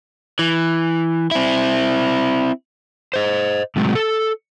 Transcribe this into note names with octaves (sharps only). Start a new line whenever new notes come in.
E3
C4 E4
C5 D#5
A2 C3 F#3 G#3
A4